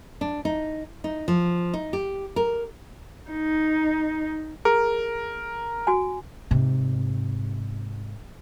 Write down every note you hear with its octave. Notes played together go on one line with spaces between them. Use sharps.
D4
D#4
D#4
F3
D#4
G4
A#4
D#4
G#4 A#4
F#4 G#5
G#2 C3